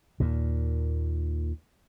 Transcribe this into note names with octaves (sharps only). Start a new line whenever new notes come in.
D#2 A#2